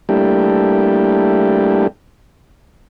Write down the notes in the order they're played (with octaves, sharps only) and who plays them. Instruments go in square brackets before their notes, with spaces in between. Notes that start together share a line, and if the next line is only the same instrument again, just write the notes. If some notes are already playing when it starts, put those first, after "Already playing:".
[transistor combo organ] G3 A3 A#3 D4 E4 G4